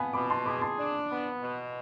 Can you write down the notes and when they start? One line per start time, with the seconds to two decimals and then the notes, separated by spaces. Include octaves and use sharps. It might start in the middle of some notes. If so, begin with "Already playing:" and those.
Already playing: B3 F5 G#5 A5 B5
0.13 B2 B5 D6
0.30 A5 C6
0.46 G#4 B5 D6
0.57 D6
0.61 A5 C6
0.78 D4
1.10 B3
1.41 B2